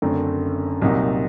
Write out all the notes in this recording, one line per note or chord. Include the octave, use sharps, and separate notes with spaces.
F#1 F#2 D3 A3 C4
C2 A#2 F#3 C4 D#4